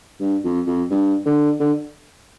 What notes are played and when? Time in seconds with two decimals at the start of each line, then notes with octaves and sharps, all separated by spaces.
0.20 G2
0.44 F2
0.67 F2
0.91 G2
1.26 D3
1.60 D3